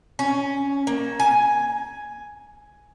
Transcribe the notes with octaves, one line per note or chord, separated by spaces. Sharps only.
C#4
A#3
G#5